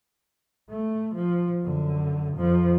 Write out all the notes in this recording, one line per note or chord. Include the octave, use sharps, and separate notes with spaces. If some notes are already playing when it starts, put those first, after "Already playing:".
A3
F3
F#2 D3
F2 F3